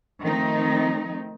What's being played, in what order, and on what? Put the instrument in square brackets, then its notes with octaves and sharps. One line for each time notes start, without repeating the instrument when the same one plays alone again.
[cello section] D#3 F3 A3 C4 D#4